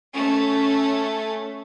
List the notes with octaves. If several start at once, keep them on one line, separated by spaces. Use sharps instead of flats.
A3 C#4